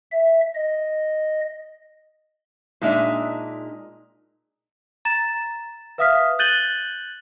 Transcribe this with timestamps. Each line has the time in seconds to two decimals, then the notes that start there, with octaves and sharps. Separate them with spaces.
0.11 E5
0.55 D#5
2.81 A#2 G#3 D4 D#4 E5
5.05 A#5 A6 E7
5.98 B4 E5 F5 D#6 F6 B6
6.39 F#6 G6 A6 D#7 F#7 G7